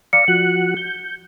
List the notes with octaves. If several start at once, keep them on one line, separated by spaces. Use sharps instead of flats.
D5 F5 A#5 C#7
F3 F#4 F#6
G6